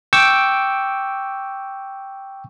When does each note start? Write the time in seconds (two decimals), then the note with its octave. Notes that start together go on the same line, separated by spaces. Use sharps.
0.13 G5 C#6 D6 E6